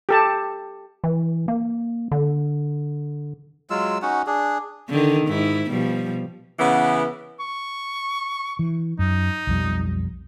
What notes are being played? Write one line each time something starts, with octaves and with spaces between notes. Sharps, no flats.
G4 A4 A5
E3
A#3
D3
F#3 G#3 F4 E6
C#4 D#4 F#4 F#5
D4 G#4
D3 D#3
G#2 E4
B2 F3 G3
C#3 E3 B3
C#6
E3
F#2 D#4
B1 F2 G3